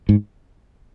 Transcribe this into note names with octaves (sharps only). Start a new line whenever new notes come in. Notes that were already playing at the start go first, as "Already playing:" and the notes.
G#2